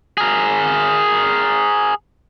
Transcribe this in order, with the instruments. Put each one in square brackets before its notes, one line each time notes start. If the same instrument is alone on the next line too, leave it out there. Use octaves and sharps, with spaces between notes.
[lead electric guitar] G#4 A#4